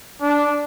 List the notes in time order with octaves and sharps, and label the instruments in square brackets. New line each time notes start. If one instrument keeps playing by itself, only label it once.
[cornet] D4